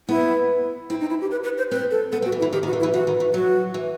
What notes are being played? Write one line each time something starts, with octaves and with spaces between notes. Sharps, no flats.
B3 E4
C4 E4
D#4
E4
G4
B4
B4
C5
C4 B4
A4
B3 A4
C4
F#4
E3
E4
E3
D#3 G4
D#3
F#4
E3
E4
E3
E3 F#4
D#3
E3
F#3 F#4
E3